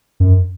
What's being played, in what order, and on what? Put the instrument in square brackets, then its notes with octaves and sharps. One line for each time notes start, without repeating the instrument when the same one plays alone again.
[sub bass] F#2